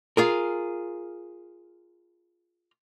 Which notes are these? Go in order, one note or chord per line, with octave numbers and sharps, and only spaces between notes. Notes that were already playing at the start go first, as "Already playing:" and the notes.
F4 G#4 A#4